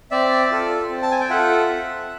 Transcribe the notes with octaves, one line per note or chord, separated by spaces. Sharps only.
C4 D5 E5
F4 A4
C4
A5
G#5
G5
F4 A4 E5 F#5
C4